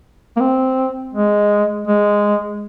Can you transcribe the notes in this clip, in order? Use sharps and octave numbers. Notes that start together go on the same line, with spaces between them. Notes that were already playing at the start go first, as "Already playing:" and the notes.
A#3
C4
G#3
G#3